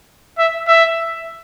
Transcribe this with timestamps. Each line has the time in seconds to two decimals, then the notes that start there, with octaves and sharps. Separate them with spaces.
0.38 E5
0.68 E5